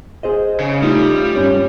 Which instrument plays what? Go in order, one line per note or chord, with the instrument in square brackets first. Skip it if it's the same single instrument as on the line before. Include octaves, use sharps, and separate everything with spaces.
[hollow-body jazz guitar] G#4 C5 D#5
[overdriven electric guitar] C#3
[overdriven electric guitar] G3 [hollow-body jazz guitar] A3 D#4 F4
[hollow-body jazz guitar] G2 C#4 C#5